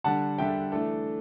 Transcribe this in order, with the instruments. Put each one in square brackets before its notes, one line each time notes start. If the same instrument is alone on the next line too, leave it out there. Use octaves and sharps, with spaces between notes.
[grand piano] D3 G3 D4 F#5 A5
D3 G3 D4 E5 G5
E3 A3 D4 A4